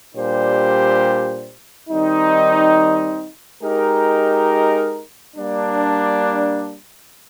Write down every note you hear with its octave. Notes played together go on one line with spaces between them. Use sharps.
A#2 G3 D4 G4 C5
D#3 G3 C4 D#4
G#3 D#4 G4 A#4
G3 A#3 D4